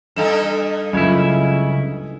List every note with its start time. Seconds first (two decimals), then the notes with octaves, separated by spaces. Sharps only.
0.16 G2 D#4 A4 E7
0.93 F#1 C#2 C#3 E4 G#6